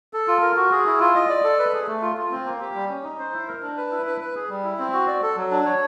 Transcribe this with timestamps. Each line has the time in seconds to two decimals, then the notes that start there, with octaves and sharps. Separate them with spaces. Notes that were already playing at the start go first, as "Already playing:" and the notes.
0.13 A4
0.28 F4
0.42 A#4
0.56 F#4
0.71 G#4
0.86 E4
1.00 F4
1.15 D#5
1.29 D5
1.44 A4
1.59 B4
1.73 G#4
1.87 A3
2.02 F4
2.17 F4
2.31 C4
2.46 A#3
2.60 G4
2.75 G3
2.89 C#4
3.04 D#4
3.19 C5
3.33 E4
3.48 A#4
3.62 D4
3.77 B4
3.91 E4
4.06 B4
4.21 B4
4.35 G#4
4.49 G3
4.64 E4
4.79 C4
4.93 F#4
5.08 D5
5.23 A4
5.37 F#3
5.51 D4
5.66 C#5